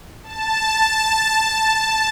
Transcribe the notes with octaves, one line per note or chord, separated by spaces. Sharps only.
A5